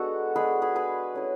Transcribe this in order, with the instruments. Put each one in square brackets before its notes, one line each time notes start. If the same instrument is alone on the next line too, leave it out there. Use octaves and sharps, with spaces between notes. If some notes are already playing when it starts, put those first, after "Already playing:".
Already playing: [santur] G#3 B3 D4 F#4 A4
G#3 D4 G#4 B4
G#4 B4
G#4 B4
A3 C#4 E4